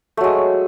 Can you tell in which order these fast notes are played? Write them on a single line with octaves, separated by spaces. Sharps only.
A3 F#3 G#3